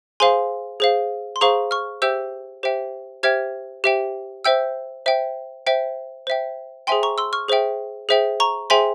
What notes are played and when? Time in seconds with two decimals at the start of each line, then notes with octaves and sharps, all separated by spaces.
0.20 G#4 C5 F5 G#5 C6
0.80 G#4 C5 F5
1.36 C6
1.41 G#4 C5 F5 A#5 C#6
1.71 C#6 F6
2.02 G4 C5 E5 G5 E6 G6
2.63 G4 C5 E5 G5
3.23 G4 C5 E5 G5 F6 G#6
3.84 G4 C5 E5 G5
4.45 C5 E5 G5 E6 G6
5.06 C5 E5 G5
5.67 C5 E5 G5
6.27 C5 E5 G5
6.87 G#4 C5 E5 G5 G#5 C6
7.03 A#5 C#6
7.18 C6 E6
7.33 C#6 F6
7.48 G#4 C5 E5 G5
8.09 G#4 C5 E5 G5
8.40 A#5 C#6
8.70 G#4 C5 E5 G5 G#5 C6